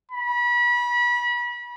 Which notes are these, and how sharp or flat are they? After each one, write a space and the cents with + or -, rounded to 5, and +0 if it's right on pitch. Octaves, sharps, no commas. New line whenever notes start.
B5 -30